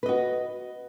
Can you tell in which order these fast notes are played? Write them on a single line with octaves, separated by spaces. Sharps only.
B4 D#5 F#4